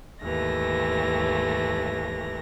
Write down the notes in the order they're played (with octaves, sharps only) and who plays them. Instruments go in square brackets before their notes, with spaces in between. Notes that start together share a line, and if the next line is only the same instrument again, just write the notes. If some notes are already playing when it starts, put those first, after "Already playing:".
[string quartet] D#2 G#2 E3 A3 A#6